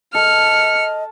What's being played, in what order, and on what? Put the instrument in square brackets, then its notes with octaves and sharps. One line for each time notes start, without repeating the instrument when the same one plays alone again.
[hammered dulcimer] A4 [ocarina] D#5 [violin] F6 [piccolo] C#7